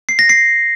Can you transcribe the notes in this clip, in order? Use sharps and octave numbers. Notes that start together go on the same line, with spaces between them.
C7
A#6
C7